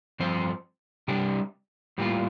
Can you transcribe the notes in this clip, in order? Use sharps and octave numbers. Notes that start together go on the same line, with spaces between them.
G2 F3 C4 F4 C5
C3 G3 D4 G4
A2 G3 A#3 F4